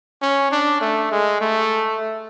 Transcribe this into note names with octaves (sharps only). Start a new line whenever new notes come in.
C#4
D4
A3
G#3
A3